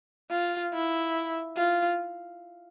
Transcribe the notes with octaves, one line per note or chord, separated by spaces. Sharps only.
F4
E4
F4